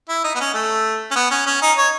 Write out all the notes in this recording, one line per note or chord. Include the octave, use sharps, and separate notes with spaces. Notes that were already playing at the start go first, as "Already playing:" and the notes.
E4
D#4
B3
C#4
A3
C#4
B3
C#4
C#4
D#4
C#5